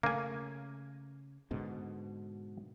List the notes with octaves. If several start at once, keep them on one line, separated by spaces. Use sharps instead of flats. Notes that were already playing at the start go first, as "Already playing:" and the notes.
C#3 A3 A#3 G#5
G#2 B2 D3